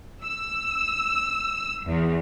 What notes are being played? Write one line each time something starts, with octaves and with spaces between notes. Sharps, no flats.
E6
E2